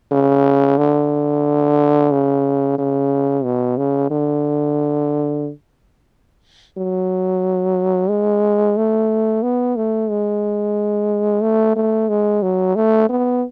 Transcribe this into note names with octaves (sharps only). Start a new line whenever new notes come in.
C#3
D3
C#3
C#3
B2
C#3
D3
F#3
G#3
A3
B3
A3
G#3
A3
A3
G#3
F#3
A3
B3